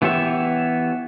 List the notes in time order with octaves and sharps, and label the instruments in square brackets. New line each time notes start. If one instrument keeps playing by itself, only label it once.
[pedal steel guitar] E3 B3 G4 C#5 E5